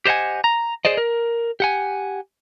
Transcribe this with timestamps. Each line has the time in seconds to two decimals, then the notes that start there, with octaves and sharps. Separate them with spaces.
0.05 G4 C5 D#5 F#5 G#5
0.44 A#5
0.85 G#4 C5 D5 D#5
0.97 A#4
1.60 G4 F#5 G#5